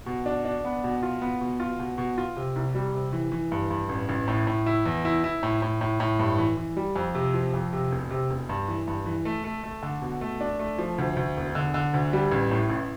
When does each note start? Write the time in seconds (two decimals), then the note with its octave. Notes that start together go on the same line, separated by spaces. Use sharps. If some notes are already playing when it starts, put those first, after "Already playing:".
0.06 B2
0.26 D4
0.45 D4
0.65 B3
0.84 B2
1.03 F4
1.21 B3
1.41 B2
1.60 F4
1.79 B2
1.98 B2
2.18 F4
2.36 C3
2.56 C2
2.75 G3
2.94 C3
3.13 E3
3.32 E3
3.52 G2
3.70 G2
3.89 A1
4.09 A1
4.28 A2
4.47 A2
4.66 E4
4.86 E2
5.05 E4
5.24 E4
5.43 A2
5.62 A2
5.81 A2
6.00 A2
6.19 G2
6.38 E3
6.57 E3
6.77 G3
6.96 F2
7.15 C3
7.34 F3
7.54 F2
7.73 C3
7.92 E1
8.11 C3
8.30 E1
8.49 G2
8.68 E3
8.87 G2
9.06 E3
9.25 A3
9.44 A3
9.63 A3
9.83 D3
10.02 B2
10.21 A3
10.41 D4
10.59 A3
10.78 F3
10.98 D2
11.16 D2
11.37 E1
11.55 D3
11.74 D3
11.94 D2
12.13 G3
12.32 A1
12.51 A2
12.70 A1